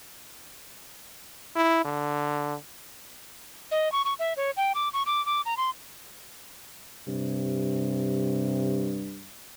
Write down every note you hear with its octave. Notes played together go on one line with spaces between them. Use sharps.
E4
D3
D#5
C#6
C#6
E5
C#5
G5
D6
C#6
D6
D6
A#5
C6
G2 C3